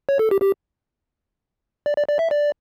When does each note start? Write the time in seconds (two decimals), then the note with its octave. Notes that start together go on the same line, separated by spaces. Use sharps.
0.09 C#5
0.19 A4
0.31 G4
0.42 G4
1.86 D5
1.97 D5
2.08 D5
2.19 E5
2.31 D5